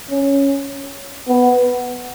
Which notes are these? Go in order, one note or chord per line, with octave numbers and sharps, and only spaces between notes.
C#4
B3